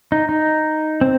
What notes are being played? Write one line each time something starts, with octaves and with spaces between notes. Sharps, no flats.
D#4
D#4
C4